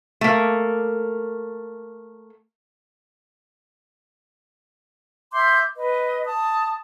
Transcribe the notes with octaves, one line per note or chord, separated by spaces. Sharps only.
A3 A#3
E5 C6 D6 G6
B4 D#5
A5 D#6